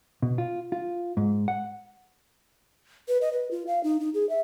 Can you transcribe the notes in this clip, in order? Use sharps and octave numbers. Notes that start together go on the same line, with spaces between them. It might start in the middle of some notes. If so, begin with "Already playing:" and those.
B2
F4
F4
G#2
F#5
B4
D#5
B4
F4
F5
D#4
D#4
G#4
E5